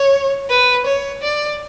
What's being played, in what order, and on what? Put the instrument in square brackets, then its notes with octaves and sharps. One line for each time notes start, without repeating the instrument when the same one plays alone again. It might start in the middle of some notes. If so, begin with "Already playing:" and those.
Already playing: [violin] C#5
B4
C#5
D5